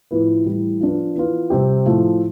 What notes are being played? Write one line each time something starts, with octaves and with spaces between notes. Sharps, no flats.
A2 F3 B3 E4 B4
A2 E3 G3
F3 B3 D4 F4
E3 B3 F4
C3 G3 C4 G4
A2 F3 A3